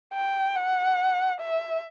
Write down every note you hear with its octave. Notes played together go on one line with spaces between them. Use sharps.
G5
F#5
E5